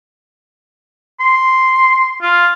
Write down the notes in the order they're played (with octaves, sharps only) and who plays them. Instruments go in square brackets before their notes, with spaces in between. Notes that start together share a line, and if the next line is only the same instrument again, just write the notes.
[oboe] C6
F4